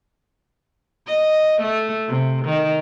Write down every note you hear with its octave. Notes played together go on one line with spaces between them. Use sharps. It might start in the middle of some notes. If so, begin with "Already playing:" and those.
D#5
A3
C3
D#3